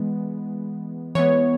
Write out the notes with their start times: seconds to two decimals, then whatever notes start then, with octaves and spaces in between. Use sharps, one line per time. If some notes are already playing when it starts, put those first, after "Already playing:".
Already playing: E3 G#3 B3
1.15 E3 G#3 B3 C#5